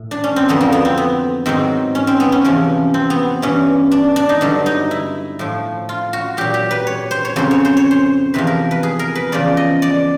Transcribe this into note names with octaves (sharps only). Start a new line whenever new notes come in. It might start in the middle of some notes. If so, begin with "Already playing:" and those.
Already playing: A2
D4
C#4
C4
F2 D3 F#3 B3
A#3
B3
C4
B3
G#2 D#3 F#3 C4
C#4
C4
B3
C#4
E2 C3 F3 C#4
C4
B3
G2 E3 C#4
D4
D4
D#4
G2 D3 F#3
D#4
E4
A2 F3
F4
F#4
A#2 F#3 G4
G4
B4
C#5
C5
C#5
F2 C#3 F#3 C5
C#5
C5
C#5
C5
E2 C3 F3 B4
A#4
B4
G#4
A#4
B4
E2 C#3 F3 D5
D#5
D5